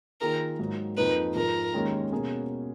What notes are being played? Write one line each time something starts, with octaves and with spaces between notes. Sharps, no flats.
D#3 A#3 F4 G#4 A#4
G#2 F#3 A#3
F2 F3 A#3 D#4 B4
G#2 F3 G#3 A#4
D#2 D#3 G#3 C#4
B2 A#3 C#4 G#4